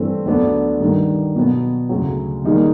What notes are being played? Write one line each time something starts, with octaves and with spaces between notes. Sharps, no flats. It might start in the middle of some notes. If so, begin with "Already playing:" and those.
Already playing: G2 E3 A3 C4
D2 D3 F#3 B3 D4
G2 D#3 G3
B2 F#3 B3
D2 C#3 F#3
D#3 G3 A#3 D#4 G#4